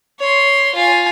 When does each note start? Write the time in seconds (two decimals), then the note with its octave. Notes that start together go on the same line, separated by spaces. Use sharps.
0.19 C#5 C6
0.75 F4 G#5